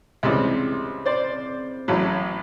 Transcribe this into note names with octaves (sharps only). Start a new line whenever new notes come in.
C#2 C3 E3 G3
C5 D5
A1 A2 F#3